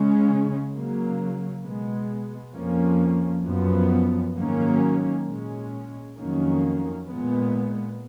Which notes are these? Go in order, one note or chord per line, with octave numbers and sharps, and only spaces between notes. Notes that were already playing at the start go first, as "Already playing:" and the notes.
Already playing: C#3 G#3 C#4
C#3 F#3 A#3
B2 G#3 B3
F2 F3 A#3 C#4
F#2 F3 B3
G#2 D#3 F#3 A#3 C#4
A#2 G#3 C#4
F2 D#3 F#3 A#3 C#4
A#2 G#3 B3